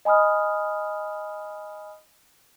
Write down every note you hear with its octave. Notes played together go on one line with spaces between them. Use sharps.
D#5 G#5 B5 D#6 F6